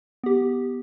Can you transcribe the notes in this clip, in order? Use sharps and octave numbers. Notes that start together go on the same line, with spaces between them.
B3 G4